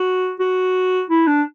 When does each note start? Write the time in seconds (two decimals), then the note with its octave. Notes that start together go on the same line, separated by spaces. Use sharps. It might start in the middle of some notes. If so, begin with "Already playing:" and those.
Already playing: F#4
0.40 F#4
1.10 E4
1.27 D4